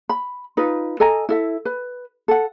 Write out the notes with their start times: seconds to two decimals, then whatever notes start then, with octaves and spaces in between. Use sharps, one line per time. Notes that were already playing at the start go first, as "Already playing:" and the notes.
0.09 B5
0.57 D#4 F4 B4
1.00 A4 D#5 G#5 A#5
1.29 E4 A4 E5
1.65 B4
2.28 A4 F#5